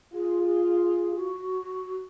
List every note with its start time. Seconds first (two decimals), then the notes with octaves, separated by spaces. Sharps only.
0.13 F4 G#4
0.44 G#4
1.16 F#4